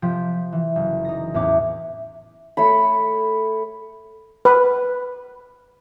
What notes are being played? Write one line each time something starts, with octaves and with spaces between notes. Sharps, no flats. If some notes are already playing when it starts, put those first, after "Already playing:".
C3 F3 G5 B6
E3
F#1
D#4 A#6
E2 A2 C#4 E5 G5 D6
A3 C#5 B5
B4